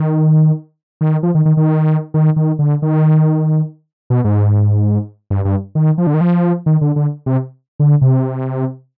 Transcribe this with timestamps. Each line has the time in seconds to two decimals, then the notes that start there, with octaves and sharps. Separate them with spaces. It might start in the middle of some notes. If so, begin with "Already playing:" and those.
Already playing: D#3
1.01 D#3
1.23 F3
1.35 D#3
1.45 D#3
1.57 D#3
2.14 D#3
2.36 D#3
2.59 D3
2.82 D#3
4.10 B2
4.24 G#2
5.31 G2
5.45 G2
5.75 D#3
5.98 F3
6.07 D3
6.14 D#3
6.21 F3
6.66 D#3
6.81 D3
6.96 D3
7.26 C3
7.80 D3
8.01 C3